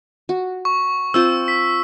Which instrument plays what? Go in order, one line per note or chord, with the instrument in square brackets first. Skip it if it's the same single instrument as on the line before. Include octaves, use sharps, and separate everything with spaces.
[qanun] F#4
[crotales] C#6
[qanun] C4 F4 C5 [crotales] E6
[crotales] B6